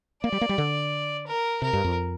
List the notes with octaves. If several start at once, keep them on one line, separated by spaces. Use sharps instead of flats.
A#3 D5
G3
A#3
G3
D3
A#4
C3 A#4
G2
F2